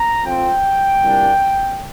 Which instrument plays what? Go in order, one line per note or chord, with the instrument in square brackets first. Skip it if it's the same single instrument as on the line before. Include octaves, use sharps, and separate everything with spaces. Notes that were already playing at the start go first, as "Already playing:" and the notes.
Already playing: [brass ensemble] A#5
F2 F3 C4 G5
C2 A#2 G3 A#3 D4